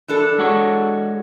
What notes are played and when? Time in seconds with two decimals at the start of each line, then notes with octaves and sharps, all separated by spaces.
0.08 E3 D4 A4
0.38 G#3 F#4 C#5